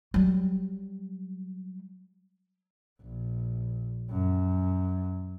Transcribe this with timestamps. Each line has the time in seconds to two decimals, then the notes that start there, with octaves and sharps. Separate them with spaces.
0.14 F#3 G3
3.02 A#1
4.11 F#2